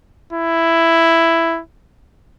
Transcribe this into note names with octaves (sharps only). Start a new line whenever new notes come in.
E4